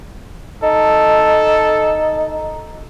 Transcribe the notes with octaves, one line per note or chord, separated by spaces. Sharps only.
D#4 A4